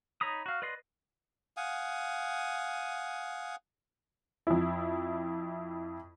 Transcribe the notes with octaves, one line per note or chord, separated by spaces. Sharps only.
D#4 C#5 A#5 B5 D#6
F#4 F5
B4 D5 D#5 C6
F5 F#5 G#5 D#6
F2 E4